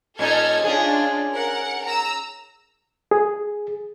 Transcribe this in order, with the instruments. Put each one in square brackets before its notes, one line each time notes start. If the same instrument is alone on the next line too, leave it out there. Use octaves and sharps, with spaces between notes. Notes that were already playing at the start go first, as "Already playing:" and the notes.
[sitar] A#2 C#4 D#4 [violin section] A4 F6 G#6
[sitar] C#4 G#4 [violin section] D4 F4
[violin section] A#4 F#5
A#5 E6
[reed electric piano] G#4